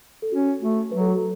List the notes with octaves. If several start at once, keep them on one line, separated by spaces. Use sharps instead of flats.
A4
C#4 F#4
A3 F#4
F#3 B4
A4
F#4
A4